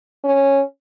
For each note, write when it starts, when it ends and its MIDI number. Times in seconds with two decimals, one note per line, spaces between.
0.24 0.62 61